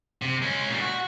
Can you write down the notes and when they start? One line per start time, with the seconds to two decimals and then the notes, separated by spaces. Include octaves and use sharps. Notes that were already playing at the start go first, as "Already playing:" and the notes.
0.22 C3
0.42 G#3 C#4
0.68 A#2 G3
0.80 F#4